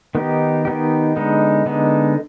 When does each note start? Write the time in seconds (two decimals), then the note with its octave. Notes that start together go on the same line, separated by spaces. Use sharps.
0.15 D#3 B3 D#4 G4
0.65 D#3 B3 D#4 G4
1.16 D3 G#3 B3 D#4
1.66 D3 G#3 B3 D#4